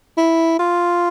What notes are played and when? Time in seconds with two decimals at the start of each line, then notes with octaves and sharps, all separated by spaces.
0.17 E4
0.59 F4